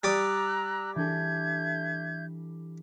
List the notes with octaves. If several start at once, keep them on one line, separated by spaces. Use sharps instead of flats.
G3 D5 A#5 D#6 E6 F#6
E3 D4 A4 E5 G6 G#6